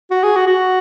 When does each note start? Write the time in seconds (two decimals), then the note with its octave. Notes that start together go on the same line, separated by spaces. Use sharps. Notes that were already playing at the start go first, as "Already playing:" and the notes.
0.11 F#4
0.24 G#4
0.36 F#4
0.47 F#4